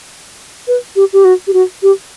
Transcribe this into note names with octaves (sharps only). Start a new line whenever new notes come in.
B4
G4
G4
F#4
G4
F#4
G4